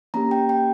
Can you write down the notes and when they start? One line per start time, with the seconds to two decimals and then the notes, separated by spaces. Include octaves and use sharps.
0.14 A#3 C#4 G4 A#5
0.31 G5
0.49 G5